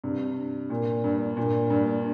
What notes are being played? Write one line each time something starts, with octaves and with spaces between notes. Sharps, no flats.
G2 C3
A#2
G2
A#2
G2